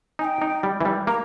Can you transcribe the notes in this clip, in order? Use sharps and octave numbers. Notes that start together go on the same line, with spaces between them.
D#4 G#5
G5
D#4
G3
E3
G3
A#3 A#5